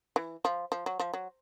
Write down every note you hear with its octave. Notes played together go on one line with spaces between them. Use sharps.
E3
F3
F3
F#3
F3
F#3